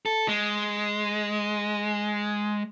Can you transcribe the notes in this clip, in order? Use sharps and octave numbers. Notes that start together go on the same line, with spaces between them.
A4
G#3